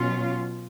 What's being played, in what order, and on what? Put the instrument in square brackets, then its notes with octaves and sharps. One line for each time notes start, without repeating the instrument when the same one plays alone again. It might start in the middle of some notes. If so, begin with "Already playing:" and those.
Already playing: [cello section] B2 F#3 C#4 F4